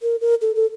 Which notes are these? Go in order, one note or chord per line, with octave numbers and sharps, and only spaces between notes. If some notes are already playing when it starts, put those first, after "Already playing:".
A#4
A#4
A4
A4